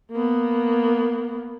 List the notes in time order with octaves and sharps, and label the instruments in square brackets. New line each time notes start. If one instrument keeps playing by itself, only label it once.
[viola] A#3 B3